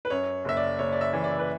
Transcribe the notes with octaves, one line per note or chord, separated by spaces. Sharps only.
B4
F#2 C#5
F#1 E5
D5
F#1 C#5
D5
E5
E3
D5
B4